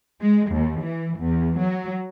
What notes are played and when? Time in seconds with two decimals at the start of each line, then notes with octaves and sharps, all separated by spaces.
0.20 G#3
0.51 D#2
0.81 E3
1.18 E2
1.59 F#3